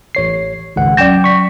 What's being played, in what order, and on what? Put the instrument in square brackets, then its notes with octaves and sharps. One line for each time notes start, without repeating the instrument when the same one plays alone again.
[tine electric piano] A1 C#5 C7
G#1 C#2 F#5
[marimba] F#3 C#4 [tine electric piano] D5 G5 G6
[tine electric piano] C#6 B6